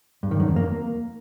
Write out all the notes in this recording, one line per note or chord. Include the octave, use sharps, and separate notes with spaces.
G2
D#3
F#2
F2
A#3